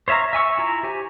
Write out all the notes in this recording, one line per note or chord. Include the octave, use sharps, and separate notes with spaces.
C5 C#5 E5 F5 A#5
E5 G#5 C#6 E6
E4 F4 A#5
G4 C5 G#5